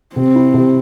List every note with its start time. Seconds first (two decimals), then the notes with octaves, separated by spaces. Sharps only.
0.16 C3 C4
0.35 E4
0.54 C3